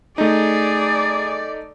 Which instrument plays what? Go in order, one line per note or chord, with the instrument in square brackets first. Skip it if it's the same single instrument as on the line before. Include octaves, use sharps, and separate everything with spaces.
[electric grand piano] A3 D#4 [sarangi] G#4 [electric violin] D5